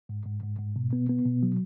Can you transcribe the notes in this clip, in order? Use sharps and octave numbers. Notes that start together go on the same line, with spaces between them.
G#2
G#2
G#2
G#2
B2
B3
B3
B2
F#3